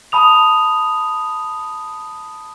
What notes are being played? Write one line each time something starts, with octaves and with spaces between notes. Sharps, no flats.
A5 B5 D#6 F7